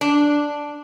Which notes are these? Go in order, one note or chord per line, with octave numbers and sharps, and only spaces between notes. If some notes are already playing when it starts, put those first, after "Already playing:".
D4